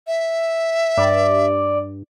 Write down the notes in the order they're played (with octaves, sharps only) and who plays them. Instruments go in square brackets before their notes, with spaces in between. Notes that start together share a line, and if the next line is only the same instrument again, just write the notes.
[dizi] E5
[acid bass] G2 [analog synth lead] D5